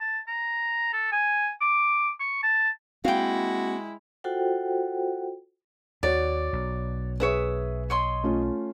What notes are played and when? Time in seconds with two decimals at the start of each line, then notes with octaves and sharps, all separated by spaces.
0.01 A5
0.28 A#5
0.93 A4
1.12 G#5
1.61 D6
2.20 C#6
2.43 A5
3.04 G#3 A#3 C4 E4 F#4 F5 G5
4.24 F4 F#4 A4 C5 F#5 G5
6.03 D#2 F#4 C#5 D5
6.53 B1
7.20 G#4 B4 C#5 E5 D#6
7.90 C#5 D#5 C6
8.24 A3 C#4 F4